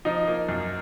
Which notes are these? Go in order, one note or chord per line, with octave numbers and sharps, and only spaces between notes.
F3 D#4 D#5
A#3
F#2